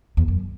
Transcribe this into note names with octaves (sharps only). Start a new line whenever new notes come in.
E2
F#2